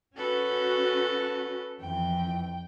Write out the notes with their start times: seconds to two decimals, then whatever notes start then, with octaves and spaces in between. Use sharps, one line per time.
0.17 C#4 F#4 A4 B4
1.80 F2 E3 G5